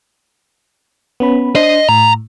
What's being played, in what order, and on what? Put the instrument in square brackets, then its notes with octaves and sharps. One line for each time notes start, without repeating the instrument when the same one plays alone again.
[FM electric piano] B3 C#4 B5
[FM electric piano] D4 C5 C7 [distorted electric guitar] D#5
[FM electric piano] A2 [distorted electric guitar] A#5